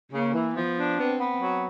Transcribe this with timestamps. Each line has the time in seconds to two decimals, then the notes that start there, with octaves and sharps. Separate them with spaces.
0.12 C#3 A#3
0.33 E3
0.55 F3 B3
0.77 D4
0.98 B3 C4
1.20 B3
1.41 F#3